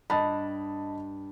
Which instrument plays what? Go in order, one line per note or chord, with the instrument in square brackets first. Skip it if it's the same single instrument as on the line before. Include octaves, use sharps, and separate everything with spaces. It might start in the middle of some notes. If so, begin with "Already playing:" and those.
[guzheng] G2 [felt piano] D#5 A5 B5